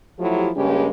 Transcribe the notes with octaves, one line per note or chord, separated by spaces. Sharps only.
F3 F#3 A3 E4 G4
G2 C#3 G#3 A#3 C#4 G4